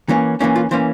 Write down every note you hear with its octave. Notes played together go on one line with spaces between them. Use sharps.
E3 A#3 C#4
E3 A#3 C#4 E4
F4
E3 A#3 C#4 C5